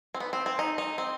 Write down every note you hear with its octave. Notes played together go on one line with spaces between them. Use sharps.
C4
B3
C4
C4
D#4
D#4
C4